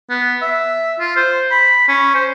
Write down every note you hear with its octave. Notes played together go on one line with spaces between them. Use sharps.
B3
E5
F4
C5
B5
C#4
C5